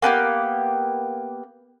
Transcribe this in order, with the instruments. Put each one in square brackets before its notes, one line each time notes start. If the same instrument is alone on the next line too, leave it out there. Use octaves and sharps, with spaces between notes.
[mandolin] A#3 B3 D4 G4